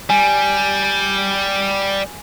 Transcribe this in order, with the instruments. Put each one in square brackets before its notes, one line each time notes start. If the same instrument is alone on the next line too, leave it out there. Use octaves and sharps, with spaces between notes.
[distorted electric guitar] G3 [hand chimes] G#5